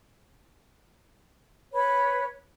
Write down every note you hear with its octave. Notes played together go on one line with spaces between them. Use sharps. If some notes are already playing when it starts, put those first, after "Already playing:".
B4 C#5 B5